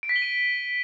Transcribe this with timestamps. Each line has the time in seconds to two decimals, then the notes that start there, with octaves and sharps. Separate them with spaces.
0.03 D7
0.09 B6
0.16 G7
0.22 D#7